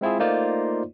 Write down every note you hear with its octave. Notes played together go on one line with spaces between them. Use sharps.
G#3 C4 E4 F4 G#4
A3 A#3 D#4 F4 C5 D5